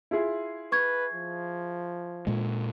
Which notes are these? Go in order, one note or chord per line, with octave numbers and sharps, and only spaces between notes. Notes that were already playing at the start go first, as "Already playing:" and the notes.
E4 F4 G#4
B4 C#6 G#6
F3
A#2 G#3